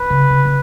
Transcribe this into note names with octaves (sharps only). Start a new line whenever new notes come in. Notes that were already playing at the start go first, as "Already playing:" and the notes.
Already playing: B4
C#3
C#3
C#3